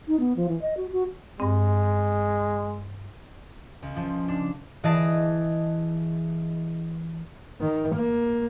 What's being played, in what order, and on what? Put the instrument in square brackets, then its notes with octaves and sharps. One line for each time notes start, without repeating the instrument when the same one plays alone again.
[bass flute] D#4
B3
F3
E3
D#5
F#4
F#4
[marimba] G2 C4 [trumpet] G#3
[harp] C#2
F3
D4
E3 G#4 D#5 A5 D7
[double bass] D#3
A#3